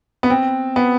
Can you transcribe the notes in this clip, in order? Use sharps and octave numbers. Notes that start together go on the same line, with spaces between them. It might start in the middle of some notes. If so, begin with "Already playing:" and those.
B3
C4
B3